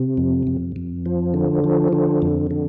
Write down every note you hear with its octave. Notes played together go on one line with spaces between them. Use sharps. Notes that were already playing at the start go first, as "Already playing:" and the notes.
Already playing: C3
F2
F2
F2
F3
D3
F3
D3
F2
D3